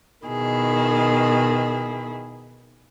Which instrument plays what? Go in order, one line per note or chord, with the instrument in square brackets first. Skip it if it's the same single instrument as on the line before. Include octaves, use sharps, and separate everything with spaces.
[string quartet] B2 D#3 E4 G#4